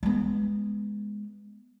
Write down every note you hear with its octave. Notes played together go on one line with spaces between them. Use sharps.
G#3 B3